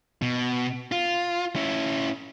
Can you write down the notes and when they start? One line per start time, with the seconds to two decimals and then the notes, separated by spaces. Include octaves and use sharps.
0.22 B2
0.92 F4
1.56 C#4 E4